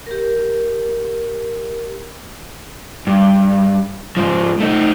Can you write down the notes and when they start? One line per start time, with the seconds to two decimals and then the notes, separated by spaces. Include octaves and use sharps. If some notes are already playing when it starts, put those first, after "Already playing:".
0.07 G4 A#4
3.07 G2
4.17 G#2 F3
4.60 A3 D#4